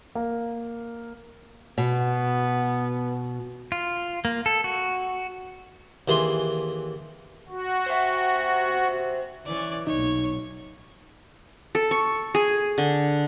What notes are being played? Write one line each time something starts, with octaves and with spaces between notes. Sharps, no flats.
A#3
B2 B3
F4
A#3
A4
F#4
D#2 E3 G#4 C6
F#4
C5 E5
E3 C#4 D5
B1 A#2 D#4 C#5
A4
C#6
G#4
D3